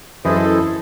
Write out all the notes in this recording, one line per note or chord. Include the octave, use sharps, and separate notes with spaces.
F#2 E3 E4 G#4 A4 C5 D#5